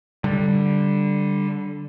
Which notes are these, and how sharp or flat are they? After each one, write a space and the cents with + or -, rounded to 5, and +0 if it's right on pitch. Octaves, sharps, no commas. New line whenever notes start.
D3 +0 G3 +0